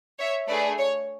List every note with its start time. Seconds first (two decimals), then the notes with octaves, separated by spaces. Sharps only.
0.19 C#5 E5
0.48 A3 D4 G#4 B4 D5
0.78 C#5